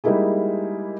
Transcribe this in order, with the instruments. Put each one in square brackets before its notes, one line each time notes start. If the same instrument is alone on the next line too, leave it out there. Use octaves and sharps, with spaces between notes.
[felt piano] G3 G#3 A#3 D#4 E4 G#4